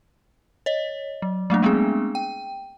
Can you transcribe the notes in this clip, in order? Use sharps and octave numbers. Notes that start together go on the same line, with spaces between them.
C#5 D#5
F#3
F#3 A3 A#3 D4
G#3 A3 B3 C4 D4 G#4
G5